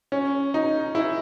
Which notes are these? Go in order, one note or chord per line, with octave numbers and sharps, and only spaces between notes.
C#4
D#4
E4